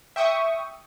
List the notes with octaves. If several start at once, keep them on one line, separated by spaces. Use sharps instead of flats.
E5 G5 C#6 D#6